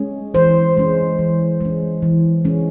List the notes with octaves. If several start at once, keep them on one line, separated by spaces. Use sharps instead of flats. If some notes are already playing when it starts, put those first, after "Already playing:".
Already playing: G#3 C#4 G#4
E3 C5
G#3 C#4
E3
G#3 C#4
E3
G#3 C#4